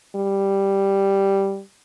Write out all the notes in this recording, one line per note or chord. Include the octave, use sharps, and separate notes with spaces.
G3